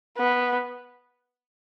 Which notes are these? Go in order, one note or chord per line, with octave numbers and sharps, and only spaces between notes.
B3